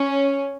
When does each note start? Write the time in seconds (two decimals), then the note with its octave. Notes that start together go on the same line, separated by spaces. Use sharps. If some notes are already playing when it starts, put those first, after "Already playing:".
Already playing: C#4